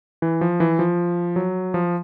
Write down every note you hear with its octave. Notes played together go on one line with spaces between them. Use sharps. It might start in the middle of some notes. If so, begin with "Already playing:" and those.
E3
F3
E3
F3
F#3
F3